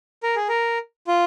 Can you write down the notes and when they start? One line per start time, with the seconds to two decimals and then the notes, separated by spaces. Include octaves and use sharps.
0.23 A#4
0.36 G#4
0.48 A#4
1.07 F4